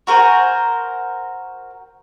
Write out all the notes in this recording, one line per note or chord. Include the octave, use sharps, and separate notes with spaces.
F#4 A#4 C5 G#5